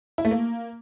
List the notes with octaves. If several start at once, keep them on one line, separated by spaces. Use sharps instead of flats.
E4
A3
A#3